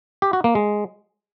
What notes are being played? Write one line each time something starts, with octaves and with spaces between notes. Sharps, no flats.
G4
F#4
A#3
G#3